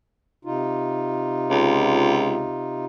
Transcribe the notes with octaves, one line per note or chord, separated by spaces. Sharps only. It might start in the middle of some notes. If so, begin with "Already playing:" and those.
C3 D#4 F4
C#2